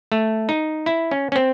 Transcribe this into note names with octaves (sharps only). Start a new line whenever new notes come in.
A3
D#4
E4
C#4
C#4
C4